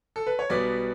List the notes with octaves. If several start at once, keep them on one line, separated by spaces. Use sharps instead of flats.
A4
B4
C#5
B1 B2 G3 B4 D5